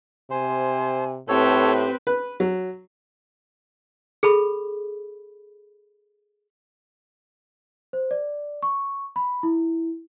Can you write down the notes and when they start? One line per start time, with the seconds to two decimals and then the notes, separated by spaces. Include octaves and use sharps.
0.31 C3 C5 G#5
1.29 A2 C4 G4 A4 B4 C#5
2.07 B4
2.40 F#3
4.23 G#4 A4 B5
7.93 C5
8.11 D5
8.63 C#6
9.16 B5
9.43 E4